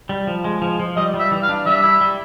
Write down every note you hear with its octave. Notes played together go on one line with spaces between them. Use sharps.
G3
F3
G#3
F3
F3
G3 D#5
G3
E5
E3
F5
D4
G3 E5
E4
G3